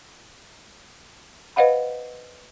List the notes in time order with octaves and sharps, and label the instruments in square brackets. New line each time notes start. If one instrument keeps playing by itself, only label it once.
[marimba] B4 C5 D#5 F5 F#5 B5